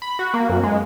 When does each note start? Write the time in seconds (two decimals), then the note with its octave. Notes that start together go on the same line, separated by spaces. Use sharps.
0.02 B5
0.19 F#4
0.34 A#3
0.49 F#2
0.63 G#3